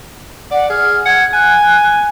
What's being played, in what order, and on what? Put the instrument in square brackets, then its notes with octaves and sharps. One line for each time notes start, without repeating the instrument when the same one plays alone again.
[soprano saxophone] D5 [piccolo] F#5
[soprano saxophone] G#4 [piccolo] F6
[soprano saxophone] F#5 [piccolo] G#6
[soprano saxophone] G#5 [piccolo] F#6